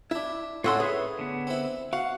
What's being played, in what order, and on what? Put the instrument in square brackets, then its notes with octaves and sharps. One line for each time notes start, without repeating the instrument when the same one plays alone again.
[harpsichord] D4 E5 [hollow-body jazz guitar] E4
[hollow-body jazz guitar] A2 F#5 C6 [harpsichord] A3 C#4 [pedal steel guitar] F4 F#4 E6
[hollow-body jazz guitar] G#4 [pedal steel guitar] B4 C#5 E5
[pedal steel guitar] D3 B3
[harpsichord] C4 E4
[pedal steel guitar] F#4 [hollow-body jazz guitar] F5 [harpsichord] F#5